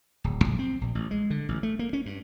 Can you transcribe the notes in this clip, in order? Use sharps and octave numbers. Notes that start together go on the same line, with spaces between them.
D1
A#1
C4
A#1
A1
G#3
D3
A1
A3
A#3
C#4
G2